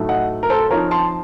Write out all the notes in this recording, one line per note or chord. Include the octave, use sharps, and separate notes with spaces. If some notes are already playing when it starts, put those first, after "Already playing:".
Already playing: A2 F#3 A3 D#4
D#5 F#5
A#4
A4 C5
F3 C4 D#4 A#4 C#5
A5 C6